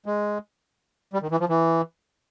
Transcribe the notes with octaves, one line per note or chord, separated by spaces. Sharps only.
G#3
G3
D#3
E3
F3
E3